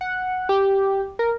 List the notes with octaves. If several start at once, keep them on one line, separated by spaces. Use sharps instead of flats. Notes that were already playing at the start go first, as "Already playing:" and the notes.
F#5
G4
A#4